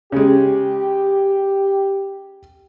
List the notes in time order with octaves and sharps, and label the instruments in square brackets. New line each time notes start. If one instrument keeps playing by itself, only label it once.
[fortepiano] C#3 G#3 [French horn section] G4